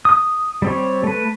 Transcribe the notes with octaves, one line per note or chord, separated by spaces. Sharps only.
D#6
G3 C4 C#5
A3 B4